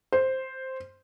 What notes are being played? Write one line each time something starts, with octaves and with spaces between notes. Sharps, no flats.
C5